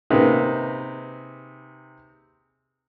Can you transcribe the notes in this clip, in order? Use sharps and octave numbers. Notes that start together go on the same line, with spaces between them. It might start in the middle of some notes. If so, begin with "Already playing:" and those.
C3 A#3 D#4 G#4 B4